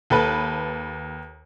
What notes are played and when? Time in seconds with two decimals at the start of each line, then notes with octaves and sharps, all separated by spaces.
0.10 D#2 A4 B4